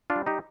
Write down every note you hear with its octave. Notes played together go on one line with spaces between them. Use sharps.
D4 F4
G3
D#4 G4